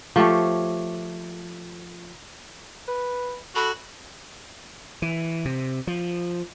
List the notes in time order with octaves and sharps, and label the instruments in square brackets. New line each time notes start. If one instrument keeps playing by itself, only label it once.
[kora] F3 A3 G4 C#5
[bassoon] B4
[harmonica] F#4 [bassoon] A4 [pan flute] B5
[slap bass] E3
C3
F3